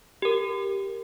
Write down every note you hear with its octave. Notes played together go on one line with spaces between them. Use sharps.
G4 A#4